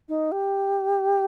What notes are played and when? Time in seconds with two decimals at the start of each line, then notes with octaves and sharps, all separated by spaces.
0.09 D#4
0.32 G4